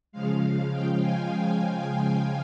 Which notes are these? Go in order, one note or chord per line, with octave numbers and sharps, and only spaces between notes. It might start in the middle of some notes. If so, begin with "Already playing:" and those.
C#3 F3 G#3 F5
G5
G#5
G5